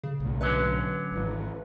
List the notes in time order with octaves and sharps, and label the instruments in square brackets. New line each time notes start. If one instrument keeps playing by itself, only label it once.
[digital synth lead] C#3
[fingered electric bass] B1 A2
[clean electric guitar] D3 F#3 C#4 [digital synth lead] B4
[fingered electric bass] G#1 E3